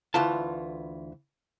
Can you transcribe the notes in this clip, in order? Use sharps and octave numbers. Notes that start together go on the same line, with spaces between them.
D2 E3 F4 A5